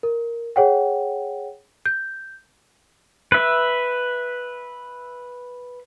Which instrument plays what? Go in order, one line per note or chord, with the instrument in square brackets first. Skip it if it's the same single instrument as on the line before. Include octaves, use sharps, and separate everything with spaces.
[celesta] A#4
G#4 C#5 F#5 G5
G6
[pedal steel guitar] B4 E5